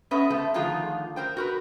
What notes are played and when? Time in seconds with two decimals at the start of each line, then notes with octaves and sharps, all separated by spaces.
0.11 B3 C#4 A4 B4 D#5 E5
0.30 A3 C4 A4 E5
0.54 D3 D#3 F3 A3 F4 G#4
1.16 A#4 C5 G5
1.37 F#4 A#4 B4